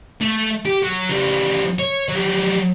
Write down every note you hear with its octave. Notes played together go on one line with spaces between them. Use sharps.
A3
G4
F#3
C#3 G3
C#5
F#3 G3